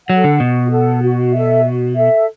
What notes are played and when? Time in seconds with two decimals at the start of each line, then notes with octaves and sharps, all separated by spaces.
0.09 F#3 A4 F#5
0.24 D3
0.40 B2 F#4
0.71 A4 F#5
1.02 F#4
1.33 A4 E5
1.64 F#4
1.95 A4 E5